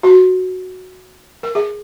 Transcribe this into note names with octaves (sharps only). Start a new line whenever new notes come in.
F#4
A#4
G#4